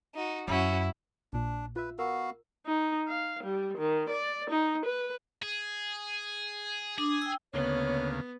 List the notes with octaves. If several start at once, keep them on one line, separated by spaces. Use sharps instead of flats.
D#4 F#4
F#2 C#4 E4 F#4
A#1 A#2 D4
F4 B4 E5
B3 F#4 A#4 F5 E6
D#4
F5
G3
D#3
D5
D#4
B4
G#4
D4 G#4 D6
G5 E6
D2 C#3 A#3 B3 C#5